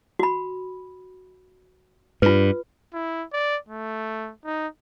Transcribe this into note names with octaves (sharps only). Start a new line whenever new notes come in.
F#4 B5
G2 F4 B4
E4
D5
A3
D#4